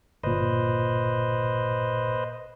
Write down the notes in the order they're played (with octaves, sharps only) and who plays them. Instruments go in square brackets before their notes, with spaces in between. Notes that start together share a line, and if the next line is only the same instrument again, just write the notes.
[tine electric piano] G1 A#2 [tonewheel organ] B4 C5 D#5